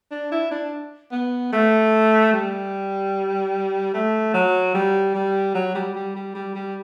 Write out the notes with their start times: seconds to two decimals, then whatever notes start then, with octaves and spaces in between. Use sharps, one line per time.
0.11 D4
0.32 E4
0.51 D4
1.12 B3
1.53 A3
2.33 G3
3.94 A3
4.34 F#3
4.74 G3
5.15 G3
5.54 F#3
5.75 G3
5.95 G3
6.16 G3
6.35 G3
6.55 G3